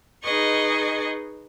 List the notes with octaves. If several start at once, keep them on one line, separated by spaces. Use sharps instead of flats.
D#4 G#4 B4 D#5 C#6